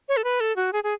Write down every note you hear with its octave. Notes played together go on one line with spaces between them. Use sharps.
C#5
A4
B4
A4
F#4
G#4
G#4